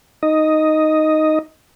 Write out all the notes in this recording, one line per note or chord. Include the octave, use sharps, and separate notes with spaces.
D#4 D#5